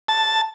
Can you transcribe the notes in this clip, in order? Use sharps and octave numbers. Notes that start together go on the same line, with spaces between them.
A5